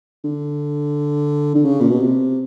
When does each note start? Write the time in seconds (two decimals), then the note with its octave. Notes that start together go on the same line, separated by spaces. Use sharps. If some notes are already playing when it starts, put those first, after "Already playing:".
0.24 D3
1.55 D3
1.65 C#3
1.80 A#2
1.90 B2
2.00 C3